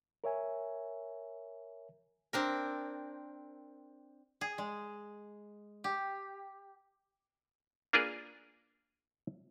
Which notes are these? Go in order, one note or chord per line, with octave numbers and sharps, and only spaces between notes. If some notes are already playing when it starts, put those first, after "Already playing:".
A#4 C#5 E5 G#5
C4 D4 A#4
G#4
G#3
G4
A#3 D4 F4 G#4 A#4 B4